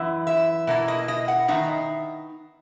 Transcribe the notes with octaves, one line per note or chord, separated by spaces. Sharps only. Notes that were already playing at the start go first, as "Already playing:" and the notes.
Already playing: F#2 E3 B3 E4
E5
B2 A#3 E4
D#5
D#5
F#5
D#3 G#3 B3 D#4 E5